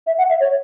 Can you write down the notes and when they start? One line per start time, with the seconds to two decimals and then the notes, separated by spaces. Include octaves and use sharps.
0.07 E5
0.18 F#5
0.30 E5
0.40 C#5